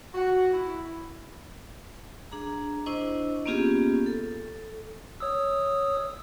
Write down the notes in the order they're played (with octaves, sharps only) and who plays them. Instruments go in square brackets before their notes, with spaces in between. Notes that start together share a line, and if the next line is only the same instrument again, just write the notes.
[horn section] F#4
E4
[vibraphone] D4 G#4 A#5
D4 E4 C5 D#5 C#6
A#3 B3 C#4 F4 G4 G#4
A4
[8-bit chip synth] C#5 D#6 E6